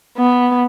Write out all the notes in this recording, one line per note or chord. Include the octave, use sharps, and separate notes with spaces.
B3